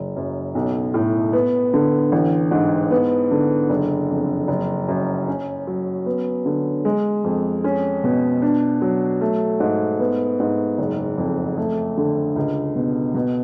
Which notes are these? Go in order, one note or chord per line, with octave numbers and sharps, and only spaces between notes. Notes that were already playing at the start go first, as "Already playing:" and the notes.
Already playing: F#1
F#2
B1
A2
B3
D3
A1
G#2
B3
D3
F#1
F2
F#1
F#2
C#4
F#3
B3
D3
G#3
F2
C#4
B2
D4
F#3
A3
G#2
B3
G#2
F#1
F2
A3
D3
C#2
B2
B2